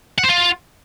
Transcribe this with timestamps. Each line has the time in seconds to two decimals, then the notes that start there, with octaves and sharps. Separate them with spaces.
0.19 F#5
0.24 C5
0.29 F4